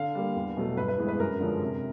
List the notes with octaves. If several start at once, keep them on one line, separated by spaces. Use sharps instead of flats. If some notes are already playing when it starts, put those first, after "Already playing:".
Already playing: D3 F5
G3 A#3
E2
B2 F#3 A3
G2 B4
B4
E3 G#3 B3
B4
F#2 A#4
D3 F3 G#3 C#4
C3